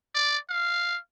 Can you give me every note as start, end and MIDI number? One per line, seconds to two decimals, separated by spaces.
0.15 0.38 74
0.50 0.98 77